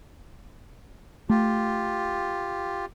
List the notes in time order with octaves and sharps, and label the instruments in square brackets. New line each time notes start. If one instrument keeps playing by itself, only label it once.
[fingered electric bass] A3 [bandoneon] F4 G4